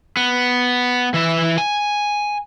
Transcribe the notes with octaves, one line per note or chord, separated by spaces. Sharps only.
B3
E3 E5
G#5